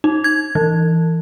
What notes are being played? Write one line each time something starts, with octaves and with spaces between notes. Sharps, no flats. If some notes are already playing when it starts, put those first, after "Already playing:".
D#4
G#6
E3